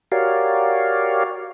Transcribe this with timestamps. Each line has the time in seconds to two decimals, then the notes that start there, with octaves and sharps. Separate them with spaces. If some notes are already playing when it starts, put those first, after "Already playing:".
0.12 F#4 G4 A#4 C#5 D5 F5